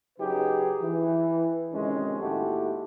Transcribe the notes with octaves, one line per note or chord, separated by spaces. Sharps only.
C#3 F#3 D#4 G4 G#4 B4
E3
F2 G#2 C3 D#3 G#3 C#4
D#2 A2 E4 F#4 G4 A4